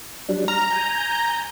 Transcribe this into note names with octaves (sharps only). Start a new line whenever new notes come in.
F#3 G3 D4
A#5 F6
G#5 G6